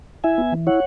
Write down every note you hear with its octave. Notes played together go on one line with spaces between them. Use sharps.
E4 E5 G#5
B3
E3
E4 C#5 F#5